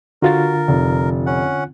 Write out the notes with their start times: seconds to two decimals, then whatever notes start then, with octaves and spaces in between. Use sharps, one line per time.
0.22 D3 F4 F#4 A#4 A6
0.68 F1
1.26 C#4 F#5